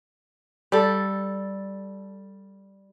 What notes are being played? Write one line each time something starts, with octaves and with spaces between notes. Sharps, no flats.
G3 A4